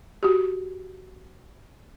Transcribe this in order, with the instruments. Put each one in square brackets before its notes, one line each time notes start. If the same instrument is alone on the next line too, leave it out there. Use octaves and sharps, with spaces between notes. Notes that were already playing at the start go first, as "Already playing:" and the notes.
[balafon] F#4 G4